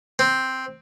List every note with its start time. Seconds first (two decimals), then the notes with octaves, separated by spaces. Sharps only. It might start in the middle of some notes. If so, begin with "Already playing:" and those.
0.19 C4